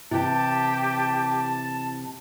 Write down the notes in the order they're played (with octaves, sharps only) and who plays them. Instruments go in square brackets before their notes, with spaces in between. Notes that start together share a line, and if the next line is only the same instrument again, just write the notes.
[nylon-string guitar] C3 E3 [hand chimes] E4 [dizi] G4 [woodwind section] A5